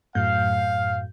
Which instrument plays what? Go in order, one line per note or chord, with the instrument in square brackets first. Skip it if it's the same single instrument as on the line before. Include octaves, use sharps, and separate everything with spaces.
[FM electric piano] F#2 A2 G6 [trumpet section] F5